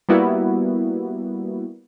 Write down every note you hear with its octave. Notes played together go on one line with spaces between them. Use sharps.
G3 A#3 B3 E4 F#4